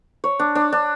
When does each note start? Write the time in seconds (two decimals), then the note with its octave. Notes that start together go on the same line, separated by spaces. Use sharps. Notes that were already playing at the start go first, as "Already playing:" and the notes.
0.24 C#5
0.39 D4
0.55 D4
0.72 D4